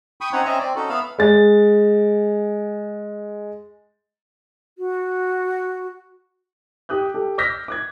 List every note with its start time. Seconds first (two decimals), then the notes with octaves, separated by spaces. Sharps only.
0.21 G5 B5 C#6 D#6
0.33 C4 C#4 D#4 C#5 F#5
0.45 C4 C#4 D#5 E5 G#5 A#5
0.59 C4 D5
0.76 C#4 D#4 F#4 A4
0.89 B3 E5 F5 B5
1.18 G#3 A6
4.78 F#4
6.89 G4 D#6 F#6 G6
7.14 G4 A4
7.38 D6 E6 F6 G6 A#6 B6
7.68 D6 F#6 G#6